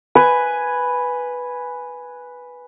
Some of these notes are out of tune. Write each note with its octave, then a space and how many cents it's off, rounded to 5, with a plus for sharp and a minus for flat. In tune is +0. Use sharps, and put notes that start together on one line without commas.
B4 +0 G#5 +0